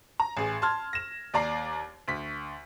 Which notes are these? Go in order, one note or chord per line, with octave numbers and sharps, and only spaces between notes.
A#5
A1 G#4
A5 C6 F6 G#6
A#6 E7
D#2 D5 A#5 C7
D2 B6